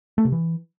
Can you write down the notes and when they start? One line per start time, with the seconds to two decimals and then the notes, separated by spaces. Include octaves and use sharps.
0.18 A3
0.25 C3
0.32 E3